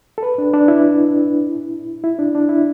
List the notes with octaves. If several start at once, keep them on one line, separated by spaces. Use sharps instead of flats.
A4
B4
D4
D4
E4
E4
D4
D4
E4